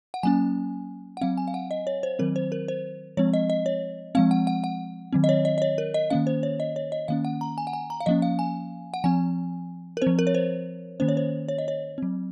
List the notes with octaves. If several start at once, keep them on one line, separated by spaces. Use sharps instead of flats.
F#5
F#3 A#3 C#4 G#5
F#5
F#3 C4 F5
G#5
F5
F#5
D#5
C#5
C5
D#3 F#3 C4 A#4
C5
A#4
C5
F3 G#3 C4 C#5
D#5
D#5
C#5
F3 G#3 C4 F5
F#5
F#5
F#5
D#3 F#3 C4
D#5
C#5
D#5
D#5
C#5
A#4
D#5
D#3 A#3 C#4 F5
C5
C#5
D#5
C#5
D#5
D#3 A#3 C#4 F5
F#5
A#5
G#5
F#5
G#5
A#5
F5
F3 A#3 C#4 D#5
F5
G#5
F#5
F3 C4 G#5
A#4
F3 C4 C5
A#4
C#5
C5
D#3 A#3 C#4 C5
C#5
C5
C#5
D#5
C#5
F#3 C4